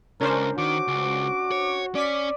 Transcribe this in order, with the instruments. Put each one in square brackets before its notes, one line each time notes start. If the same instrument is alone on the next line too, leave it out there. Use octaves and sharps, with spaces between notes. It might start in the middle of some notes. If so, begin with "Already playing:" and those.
[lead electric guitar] C#2 [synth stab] C#4 D4 C5 [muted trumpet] A#4
[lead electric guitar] D#3 [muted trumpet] F#4 [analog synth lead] D6
[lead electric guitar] C#2
C#5
[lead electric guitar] C#4 [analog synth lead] D5 [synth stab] D6 B6